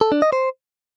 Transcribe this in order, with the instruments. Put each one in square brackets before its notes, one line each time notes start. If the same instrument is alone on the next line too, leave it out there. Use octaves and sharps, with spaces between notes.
[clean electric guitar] A4
D4
D#5
C5